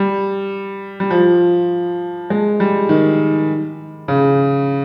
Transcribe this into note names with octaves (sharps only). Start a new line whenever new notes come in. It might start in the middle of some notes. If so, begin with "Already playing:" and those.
Already playing: G3
G3
F3
G#3
G3
D#3
C#3